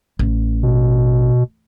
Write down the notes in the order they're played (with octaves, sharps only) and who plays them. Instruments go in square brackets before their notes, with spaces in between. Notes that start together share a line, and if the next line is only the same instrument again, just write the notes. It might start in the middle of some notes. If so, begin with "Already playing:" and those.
[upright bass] A1
[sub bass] B2